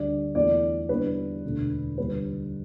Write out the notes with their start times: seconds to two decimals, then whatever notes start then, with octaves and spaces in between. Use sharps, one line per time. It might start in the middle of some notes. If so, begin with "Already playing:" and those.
Already playing: D2 D3 G3 D5
0.35 E2 E3 A3 D5
0.89 E2 D3 G3 B4
1.44 E1 D2 D3 A3
1.98 D2 D3 G3 B4